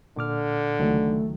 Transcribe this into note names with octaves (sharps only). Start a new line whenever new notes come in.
A#2 D3 D6 F6
C#2 D#3 F#3 A3